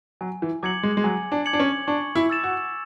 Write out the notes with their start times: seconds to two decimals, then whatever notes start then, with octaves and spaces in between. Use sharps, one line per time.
0.21 F#3 G#5
0.42 E3
0.63 F#3 D6 G#6 C#7 F#7
0.83 G#3
0.97 G#3
1.04 F#3 G#5
1.32 D4
1.46 D6 G#6 C#7 F#7
1.53 D4
1.60 C#4
1.87 D4 C#6
2.16 E4
2.30 E6 A6 E7
2.44 F#4